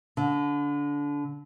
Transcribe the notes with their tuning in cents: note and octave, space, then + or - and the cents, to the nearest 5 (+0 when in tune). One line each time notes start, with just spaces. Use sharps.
D3 -25